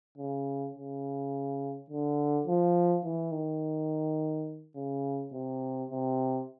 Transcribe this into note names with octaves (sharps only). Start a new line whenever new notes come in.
C#3
C#3
D3
F3
E3
D#3
C#3
C3
C3